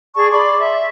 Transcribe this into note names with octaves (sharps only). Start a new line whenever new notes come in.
G#4 D5 A5 C#6
D5 B5 C6 D6
E5